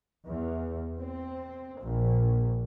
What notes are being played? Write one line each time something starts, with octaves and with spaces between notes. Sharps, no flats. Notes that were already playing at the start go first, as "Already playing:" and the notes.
E2
C4
A#1